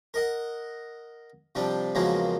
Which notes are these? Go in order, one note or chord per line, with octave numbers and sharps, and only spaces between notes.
A#4 D#5 F#5
C3 F3 G3 D4
E2 C#3 F3 F#3 G#3 A#3